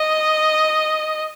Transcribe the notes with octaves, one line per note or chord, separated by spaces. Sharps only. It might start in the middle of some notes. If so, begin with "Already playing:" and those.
Already playing: D#5